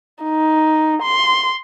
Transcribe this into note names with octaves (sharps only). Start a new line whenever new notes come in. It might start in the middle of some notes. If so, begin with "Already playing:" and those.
D#4
C6